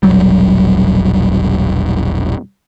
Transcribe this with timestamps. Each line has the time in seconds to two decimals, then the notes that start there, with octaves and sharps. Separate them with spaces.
0.03 E1 A#1 F#3 G3